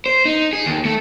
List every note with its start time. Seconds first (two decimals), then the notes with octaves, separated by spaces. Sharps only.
0.06 C5
0.25 D#4
0.53 G#4
0.66 D#2
0.85 A3